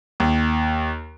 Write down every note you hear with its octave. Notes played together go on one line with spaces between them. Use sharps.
D#2